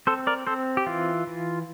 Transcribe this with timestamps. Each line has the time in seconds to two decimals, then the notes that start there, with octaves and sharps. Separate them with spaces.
0.07 C4 A4 C5
0.27 A#4 D5
0.47 C4 A4 C5
0.77 G4
0.86 E3 F4
1.27 E3